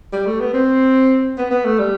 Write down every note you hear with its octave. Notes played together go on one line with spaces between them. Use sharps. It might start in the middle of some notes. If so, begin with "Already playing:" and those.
G3
A3
B3
C4
B3
B3
A3
G3